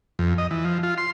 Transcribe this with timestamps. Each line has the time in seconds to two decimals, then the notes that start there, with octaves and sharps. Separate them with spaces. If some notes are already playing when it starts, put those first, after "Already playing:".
0.19 F2
0.38 D#5
0.51 E3
0.65 F3
0.83 F4
0.98 C6